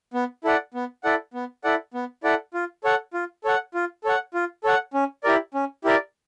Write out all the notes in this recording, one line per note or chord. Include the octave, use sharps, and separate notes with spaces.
B3
E4 A4 D5 F#5
B3
E4 A4 D5 F#5
B3
E4 A4 D5 F#5
B3
E4 A4 D5 F#5
F4
A4 C#5 F#5
F4
A4 C#5 F#5
F4
A4 C#5 F#5
F4
A4 C#5 F#5
C#4
E4 G4 A#4 D5
C#4
E4 G4 A#4 D5